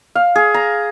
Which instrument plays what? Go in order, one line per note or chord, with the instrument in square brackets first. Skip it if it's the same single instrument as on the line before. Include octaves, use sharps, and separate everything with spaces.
[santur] F5
G#4
A#5